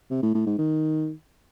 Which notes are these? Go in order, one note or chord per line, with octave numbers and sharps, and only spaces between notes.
C3
A2
A2
G#2
D#3